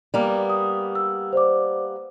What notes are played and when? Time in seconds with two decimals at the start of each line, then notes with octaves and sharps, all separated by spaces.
0.14 G3 A#3 B3
0.50 D#6
0.95 E6
1.33 C5 D5 D6